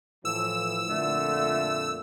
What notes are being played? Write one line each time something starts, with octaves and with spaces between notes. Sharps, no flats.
A2 E3 F3 E6
F2 A#2 D3 A3